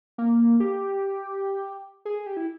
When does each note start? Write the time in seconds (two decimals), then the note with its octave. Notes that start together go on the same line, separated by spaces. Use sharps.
0.18 A#3
0.60 G4
2.05 G#4
2.26 G4
2.37 E4